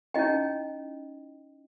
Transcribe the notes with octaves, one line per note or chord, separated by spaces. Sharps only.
C#4 D#4 E4 D#5 G5